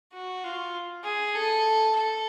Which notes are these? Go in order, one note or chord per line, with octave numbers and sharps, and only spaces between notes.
F#4
F4
G#4
A4
A4